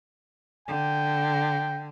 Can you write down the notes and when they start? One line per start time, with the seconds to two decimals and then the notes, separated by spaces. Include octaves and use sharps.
0.68 D3 G5